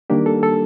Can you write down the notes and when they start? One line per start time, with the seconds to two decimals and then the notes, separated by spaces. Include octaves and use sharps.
0.10 D#3 G3 A#3 D4 G4
0.26 A4
0.43 A4